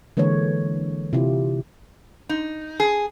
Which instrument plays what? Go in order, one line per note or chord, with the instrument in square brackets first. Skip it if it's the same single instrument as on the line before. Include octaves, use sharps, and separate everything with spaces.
[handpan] D3 E3 G#3 A#3 C#5
C3 E4 F4 G4
[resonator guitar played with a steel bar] D#4
G#4